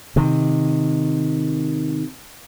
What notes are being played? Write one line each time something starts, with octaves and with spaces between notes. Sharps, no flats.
C3 D#3